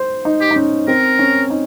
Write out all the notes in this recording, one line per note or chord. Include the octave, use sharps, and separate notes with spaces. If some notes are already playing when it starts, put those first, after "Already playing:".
Already playing: C5
D#4
G4
D#4
C#4
C4 A#4
C#4
D#4